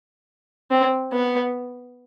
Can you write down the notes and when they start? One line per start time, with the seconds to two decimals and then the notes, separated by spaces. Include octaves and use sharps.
0.71 C4
1.13 B3